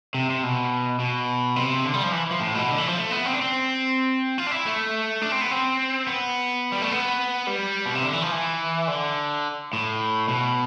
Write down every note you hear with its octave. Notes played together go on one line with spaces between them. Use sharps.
C3
C3
B2
B2
C3
D3
G3
F3
E3
F3
A2
B2
D3
E3
F3
A3
B3
C4
D4
C4
F4
D4
E4
A3
D4
C4
B3
C4
B3
G3
A3
B3
G3
B2
C3
D3
E3
F3
E3
D3
A2
B2